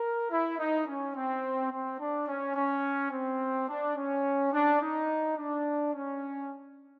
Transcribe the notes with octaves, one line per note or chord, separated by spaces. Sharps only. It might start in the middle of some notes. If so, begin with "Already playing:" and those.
Already playing: A#4
E4
D#4
C#4
C4
C4
D4
C#4
C#4
C4
D4
C#4
D4
D#4
D4
C#4